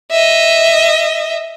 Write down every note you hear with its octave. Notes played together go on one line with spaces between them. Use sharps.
D#5 E5